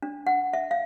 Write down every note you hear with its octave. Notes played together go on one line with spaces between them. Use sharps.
D4
F#5
E5
F5